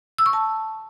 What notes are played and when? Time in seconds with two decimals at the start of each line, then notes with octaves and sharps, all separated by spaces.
0.18 E6
0.26 C#6
0.33 A5